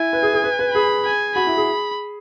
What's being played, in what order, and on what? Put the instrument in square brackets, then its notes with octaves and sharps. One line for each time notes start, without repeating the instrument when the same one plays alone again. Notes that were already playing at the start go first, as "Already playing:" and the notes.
Already playing: [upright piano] E4 [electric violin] G#5
[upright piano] B4
G#4
G#4
B4
B4
[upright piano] G#4 [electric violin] B5
[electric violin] G#5
[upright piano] F#4 [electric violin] B5
[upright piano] E4
G#4